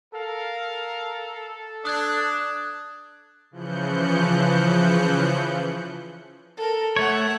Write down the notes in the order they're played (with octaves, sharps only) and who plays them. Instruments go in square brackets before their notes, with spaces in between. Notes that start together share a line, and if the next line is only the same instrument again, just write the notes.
[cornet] A4 [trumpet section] A#4 F5
[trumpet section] D4 [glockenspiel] D#6 F#6 G#6
[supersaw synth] C#3 E3 F3 F#6 G6 C#7
[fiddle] A4 A#4
[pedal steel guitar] A3 C#5 [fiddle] E5 F#5